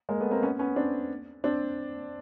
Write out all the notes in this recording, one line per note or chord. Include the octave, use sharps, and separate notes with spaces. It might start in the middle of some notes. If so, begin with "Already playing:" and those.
G#3 A#3
A3 B3
A#3 C4
B3 C#4
B3 C#4
C4 D4
C4 D4